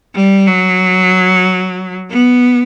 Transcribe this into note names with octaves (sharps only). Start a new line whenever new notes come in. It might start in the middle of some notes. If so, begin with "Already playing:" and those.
G3
F#3
B3